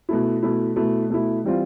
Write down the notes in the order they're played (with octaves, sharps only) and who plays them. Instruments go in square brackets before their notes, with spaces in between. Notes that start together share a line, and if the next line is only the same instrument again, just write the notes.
[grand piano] B2 A3 E4
B2 A3 E4
B2 A3 E4
B2 A3 E4
E3 G3 C4 F4